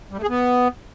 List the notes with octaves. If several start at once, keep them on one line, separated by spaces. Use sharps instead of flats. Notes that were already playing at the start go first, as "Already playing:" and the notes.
G3
A3
G#4
B3